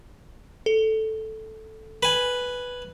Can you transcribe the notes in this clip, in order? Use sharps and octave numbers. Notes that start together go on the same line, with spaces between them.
A4
B4 G#5